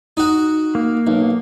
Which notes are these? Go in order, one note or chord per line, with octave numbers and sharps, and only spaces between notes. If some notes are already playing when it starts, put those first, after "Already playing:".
D#4 F#4
A#3
B1